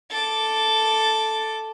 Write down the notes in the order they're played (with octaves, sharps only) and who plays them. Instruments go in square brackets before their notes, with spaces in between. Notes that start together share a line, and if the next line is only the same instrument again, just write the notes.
[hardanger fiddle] A4 D6